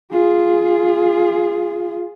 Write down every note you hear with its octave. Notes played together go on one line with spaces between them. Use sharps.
F4 G#4